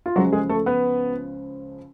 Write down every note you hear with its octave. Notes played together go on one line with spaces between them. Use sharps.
F4
C#2 C#3 F3 F#3 G#3 F#4
G#3 G#4
A3 A4
B3 B4